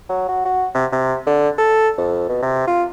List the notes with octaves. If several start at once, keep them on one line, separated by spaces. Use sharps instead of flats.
F#3
F#4
F#4
C3
C3
D3
A4
F2
B2
C3
F4